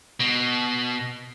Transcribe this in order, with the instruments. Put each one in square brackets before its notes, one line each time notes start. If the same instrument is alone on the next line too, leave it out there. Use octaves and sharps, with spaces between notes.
[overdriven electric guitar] B2